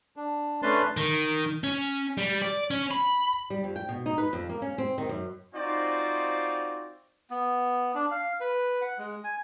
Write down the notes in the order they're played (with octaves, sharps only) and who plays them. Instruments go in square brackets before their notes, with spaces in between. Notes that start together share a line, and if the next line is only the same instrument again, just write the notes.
[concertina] D4
A3 C#4 D4 B4 A5 C6
[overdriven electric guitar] D#3
C#4
G3
D5
C#4
B5
[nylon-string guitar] G3
F2
G5
B2
D#4
B4
F2
A#3
C#4
C4
D#3
F#2
[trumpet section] C4 D#4 F4 F#4 C5 D5
[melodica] B3
D4
F5
B4
F#5
G#3
G#5